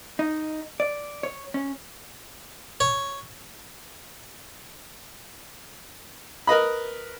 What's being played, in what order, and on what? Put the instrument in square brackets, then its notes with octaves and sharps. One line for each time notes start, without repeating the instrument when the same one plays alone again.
[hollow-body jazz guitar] D#4
D5
C#5
C#4
[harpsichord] C#5
[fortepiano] A#4 B4 D#5 B5